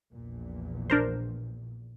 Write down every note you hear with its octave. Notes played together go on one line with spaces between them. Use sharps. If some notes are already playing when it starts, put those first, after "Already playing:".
A#1 E2 A#2
D4 A#4 C5